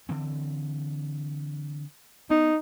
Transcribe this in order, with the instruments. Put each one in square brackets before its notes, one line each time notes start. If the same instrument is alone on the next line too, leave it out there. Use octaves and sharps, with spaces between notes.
[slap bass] D3 E3 C4
[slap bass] B3 [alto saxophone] D#4